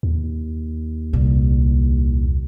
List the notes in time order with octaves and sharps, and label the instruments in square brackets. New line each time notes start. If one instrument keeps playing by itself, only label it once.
[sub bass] D#2
[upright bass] C2 A#2